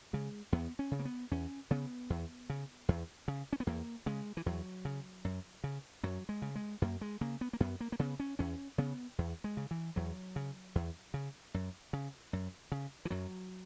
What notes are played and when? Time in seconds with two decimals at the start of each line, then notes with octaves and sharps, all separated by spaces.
0.13 C#3 G#3
0.52 E2 B3
0.79 C#4
0.91 C#3
0.99 A#3
1.05 B3
1.31 E2 C#4
1.71 C#3 B3
2.10 E2
2.50 C#3
2.89 E2
3.28 C#3
3.53 C#4
3.60 B3
3.67 E2 A#3
4.06 C#3 G#3
4.37 E3
4.46 E2 F#3
4.85 C#3
5.25 F#2
5.64 C#3
6.03 F#2 F#3
6.29 G#3
6.42 C#3
6.56 G#3
6.82 F#2 A#3
7.01 G#3
7.21 C#3 A#3
7.41 B3
7.53 A#3
7.60 F#2 B3
7.80 A#3
7.92 A#3
7.99 C#3 B3
8.20 C#4
8.39 E2 C#4
8.78 C#3 B3
9.18 E2
9.44 G#3
9.57 C#3
9.71 E3
9.96 E2 F#3
10.36 C#3
10.75 E2
11.14 C#3
11.54 F#2
11.93 C#3
12.33 F#2
12.72 C#3
13.05 E3
13.10 F#2 F#3